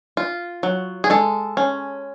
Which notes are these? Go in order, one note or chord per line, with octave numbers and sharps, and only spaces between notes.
F4
F#3
G#4
G#3 A4
C#4